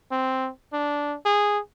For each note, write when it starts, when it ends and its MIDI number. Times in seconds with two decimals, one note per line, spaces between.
0.11 0.49 60
0.73 1.15 62
1.25 1.58 68